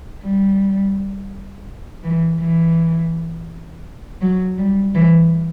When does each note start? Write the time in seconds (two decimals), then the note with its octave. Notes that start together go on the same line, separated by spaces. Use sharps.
0.23 G3
2.04 E3
2.40 E3
4.22 F#3
4.58 G3
4.94 E3